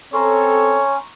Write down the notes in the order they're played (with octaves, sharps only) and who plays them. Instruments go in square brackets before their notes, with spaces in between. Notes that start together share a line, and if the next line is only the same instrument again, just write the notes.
[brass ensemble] C4 A4 [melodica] C#4 [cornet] C#5 [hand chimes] A#5 C6 C#6